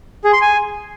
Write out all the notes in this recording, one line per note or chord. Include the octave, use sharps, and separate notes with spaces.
G#4
C6
G#5